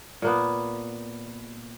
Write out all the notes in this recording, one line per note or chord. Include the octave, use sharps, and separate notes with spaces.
A#2 A#3 B3